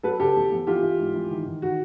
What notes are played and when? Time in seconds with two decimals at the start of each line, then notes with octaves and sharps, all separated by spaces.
0.03 F#3 A4 B4
0.20 C#3 G4 A4
0.36 E2
0.52 E2
0.67 E3 F4 G4
0.83 E3
1.00 G#2
1.15 E3
1.30 D#3
1.46 D#3
1.62 D#3 F#4